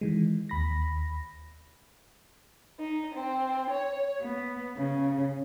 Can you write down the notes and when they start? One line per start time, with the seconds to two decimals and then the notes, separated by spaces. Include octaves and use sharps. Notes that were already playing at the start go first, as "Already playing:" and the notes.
0.01 D#3 E3 G#3
0.49 D#2 B5 A#6
2.79 D#4
3.14 C4
3.71 C#5
4.22 B3
4.76 C#3